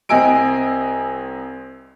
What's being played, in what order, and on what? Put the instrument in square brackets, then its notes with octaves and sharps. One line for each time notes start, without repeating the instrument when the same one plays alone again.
[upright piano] C2 C4 D#5 G#5 E6 D7